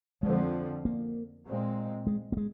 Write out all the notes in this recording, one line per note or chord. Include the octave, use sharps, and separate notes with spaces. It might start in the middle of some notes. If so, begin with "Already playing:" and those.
F2 D3 F3 G#3
A#3
A#2 G#3 C4
G#3
A#3
G#3